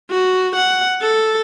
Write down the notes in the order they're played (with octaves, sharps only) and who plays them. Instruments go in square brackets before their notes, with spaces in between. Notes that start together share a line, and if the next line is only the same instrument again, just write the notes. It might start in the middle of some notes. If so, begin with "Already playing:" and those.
[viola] F#4
F#5
A4